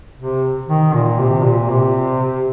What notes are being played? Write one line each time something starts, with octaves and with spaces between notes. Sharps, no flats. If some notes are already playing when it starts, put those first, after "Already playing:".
C3
D#3
A#2
C3
A#2
C3